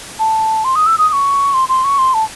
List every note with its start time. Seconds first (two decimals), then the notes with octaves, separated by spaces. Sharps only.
0.19 A5
0.64 C6
0.75 D#6
0.86 E6
0.98 D#6
1.09 D#6
1.13 C#6
1.54 C6
1.69 C6
1.84 C#6
1.98 C6
2.14 A5